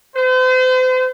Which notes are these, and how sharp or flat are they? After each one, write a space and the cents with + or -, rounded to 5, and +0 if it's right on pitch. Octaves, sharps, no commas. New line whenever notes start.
C5 -40